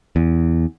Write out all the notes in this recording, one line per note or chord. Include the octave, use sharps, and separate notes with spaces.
E2